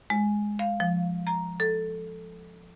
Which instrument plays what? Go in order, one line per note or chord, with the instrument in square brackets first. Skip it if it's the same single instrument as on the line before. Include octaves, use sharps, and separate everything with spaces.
[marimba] G#3
F5
F3
A#5
A4